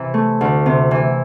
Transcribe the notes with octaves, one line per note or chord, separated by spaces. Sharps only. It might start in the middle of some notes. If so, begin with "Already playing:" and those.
Already playing: C3 E3
A3
D2
C3
E3